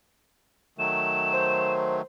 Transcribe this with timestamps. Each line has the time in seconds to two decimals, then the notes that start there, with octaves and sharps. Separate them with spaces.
0.78 D#3 F#3 A3 E7
1.33 C5